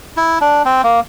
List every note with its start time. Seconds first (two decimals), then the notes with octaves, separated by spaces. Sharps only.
0.17 E4
0.41 D4
0.66 C4
0.84 A#3